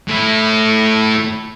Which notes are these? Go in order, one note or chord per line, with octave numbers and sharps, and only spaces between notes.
A2 E4